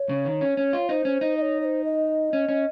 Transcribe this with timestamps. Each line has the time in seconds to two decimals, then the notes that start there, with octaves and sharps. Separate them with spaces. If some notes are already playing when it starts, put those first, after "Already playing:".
Already playing: C#5
0.09 C#3
0.25 D#3
0.41 C#4
0.57 C#4
0.73 F4
0.89 D#4 C5
1.05 C#4
1.21 D#4
1.37 D#5
1.42 C#5
1.61 C#5
1.65 C5
1.84 D#5
2.33 C#4
2.49 C#4